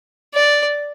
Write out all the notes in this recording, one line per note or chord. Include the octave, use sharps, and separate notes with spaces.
D5